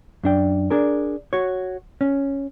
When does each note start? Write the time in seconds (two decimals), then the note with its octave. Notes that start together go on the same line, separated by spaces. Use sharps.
0.23 F#2 D4 G5
0.70 D4 G#4 A#4
1.33 F#4 C#5
2.01 C#4